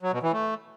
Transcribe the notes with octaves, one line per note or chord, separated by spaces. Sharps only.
F#3
B2
E3
A3